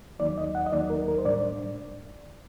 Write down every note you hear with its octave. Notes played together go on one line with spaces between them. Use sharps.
D#2 D#3 F#3 A#3 D#4 D5
D#5
F#5
D#5
D#2 D#3 F#3 A#3 D#4 D5
A#4
A#4
C5
A2 G3 D4 D5